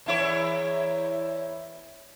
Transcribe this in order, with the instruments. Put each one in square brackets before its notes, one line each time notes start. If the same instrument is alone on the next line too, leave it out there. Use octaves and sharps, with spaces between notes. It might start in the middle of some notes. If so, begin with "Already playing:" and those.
[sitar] E2 E4 C#5